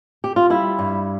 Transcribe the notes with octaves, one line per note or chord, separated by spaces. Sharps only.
G4
F4
G3 E4
G2